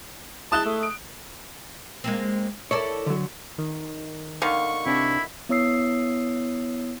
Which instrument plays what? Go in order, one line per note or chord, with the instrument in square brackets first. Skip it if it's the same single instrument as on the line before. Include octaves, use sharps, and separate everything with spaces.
[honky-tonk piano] G#3 E4 E7 [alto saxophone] A5 [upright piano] D#6 F#6 G7
[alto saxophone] A3
[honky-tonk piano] D7
[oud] G#3 A#3 C4
[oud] E4 A4 D5 [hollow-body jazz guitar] A#4 C#5
[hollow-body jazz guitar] D3 F#3
[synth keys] D#3
[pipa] D3 D#3 F5 [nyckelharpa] C#6
[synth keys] C3 C4 D4 [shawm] E4
[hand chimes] B3 E4 C#5 D#6 E6 C7